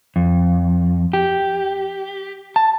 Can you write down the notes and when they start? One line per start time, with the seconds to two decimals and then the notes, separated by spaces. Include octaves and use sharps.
0.16 F2
1.13 G4
2.56 A5